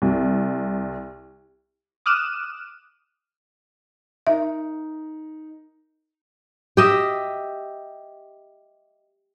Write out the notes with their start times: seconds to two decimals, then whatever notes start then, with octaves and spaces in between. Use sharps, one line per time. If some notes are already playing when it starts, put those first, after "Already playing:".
0.02 C2
2.06 D6 D#6 F6 F#6 D#7 E7
4.27 D#4 A#4 E5
6.77 G4 D#5 E5